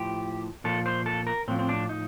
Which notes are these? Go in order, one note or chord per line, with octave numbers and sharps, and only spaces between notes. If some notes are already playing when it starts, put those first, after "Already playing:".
Already playing: A2 F3 G4
A#2 F3 A4
C5
A4
A#4
A2 F3 C4
C4
D4
D#4